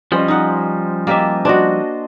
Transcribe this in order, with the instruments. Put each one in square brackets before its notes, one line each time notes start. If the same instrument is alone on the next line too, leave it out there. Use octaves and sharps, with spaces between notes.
[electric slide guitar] F3 G3 [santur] C#4 C5 D#5
[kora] D#4 F#5
[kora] A#3 G4 E5 [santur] D#5 A5
[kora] D4 F#4 [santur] C5 D#5